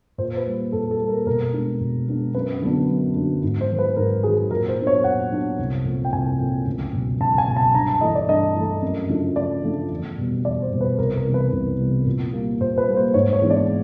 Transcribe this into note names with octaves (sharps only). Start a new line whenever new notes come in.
A#2 C5
B4
G3 A#3
A#2 A4
A4
G3 A#3
A#4
B2 A#4
G#3 B3 D4
B2
G#3 B3 D4
F#2 B4
D3 F#3 B3 D4
F#2
D3 F#3 B3 D4
G#2
C5
D#3 F#3
B4
G#2 A#4
D#3 F#3 G#4
A#2 A#4
C5
F#3 B3 D4
C#5
A#2 F#5
F#3 B3 D4
C2
A#2 F3 A3 C4
G5
C2 G#5
A#2 F3 A3 C4
C#2
B2 F#3
C#2 A5
G#5
B2 F#3
A5
G2 A#5
A5
E3 A3 D#5
D5
G2 D#5
E3 A3
F#2
C#3 F3 A3 D4
F#2 D5
C#3 F3 A3 D4
E2
B2 G3 B3
E2 D5
C5
B2 G3 B3
B4
C2 A#4
A#4
C3 E3 G3 B3
B4
C2
C3 E3 G3 B3
A#2
G3 A#3
A#2 C5
B4
G3 A#3
C5
G#2 C#5
C#5
E3 G#3 B3 D4
D5